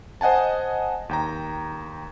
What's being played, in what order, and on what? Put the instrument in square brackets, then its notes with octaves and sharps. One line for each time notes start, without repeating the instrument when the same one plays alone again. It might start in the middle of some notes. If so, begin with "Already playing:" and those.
[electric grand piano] C5 D#5 F#5 G#5 A5
D#2 G5 A#5